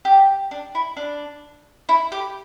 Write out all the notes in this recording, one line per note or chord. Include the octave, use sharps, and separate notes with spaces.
G4
D4
E4
D4
E4
G4